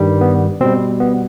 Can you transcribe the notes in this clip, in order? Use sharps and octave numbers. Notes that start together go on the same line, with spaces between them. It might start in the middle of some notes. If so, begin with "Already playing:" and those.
Already playing: G2 D#3 G3
B3
B2 G3 C4
B3